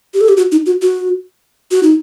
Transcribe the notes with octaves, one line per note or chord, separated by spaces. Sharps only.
G4
A4
G4
F#4
D#4
F#4
F#4
F#4
D#4